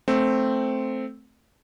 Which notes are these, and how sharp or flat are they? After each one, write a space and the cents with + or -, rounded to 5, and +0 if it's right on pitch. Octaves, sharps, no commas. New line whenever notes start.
A3 +0 C4 +0